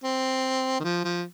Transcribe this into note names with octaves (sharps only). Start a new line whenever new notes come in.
C4
D#3
F3
F3